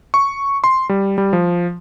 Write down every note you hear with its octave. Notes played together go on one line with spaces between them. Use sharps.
C#6
C6
G3
G3
F3